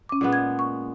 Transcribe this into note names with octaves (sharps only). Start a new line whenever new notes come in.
C#4 D6
A#2 G#3 B3
G#6
C#6